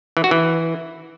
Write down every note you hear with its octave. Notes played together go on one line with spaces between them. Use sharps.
E3
F#4
E3